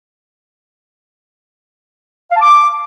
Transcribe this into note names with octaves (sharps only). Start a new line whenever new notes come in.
F5
A5
D6